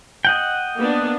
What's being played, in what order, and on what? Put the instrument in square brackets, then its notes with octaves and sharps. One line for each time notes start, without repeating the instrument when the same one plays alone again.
[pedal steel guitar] D#5 F#5 G5
[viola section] A#3 B3 D4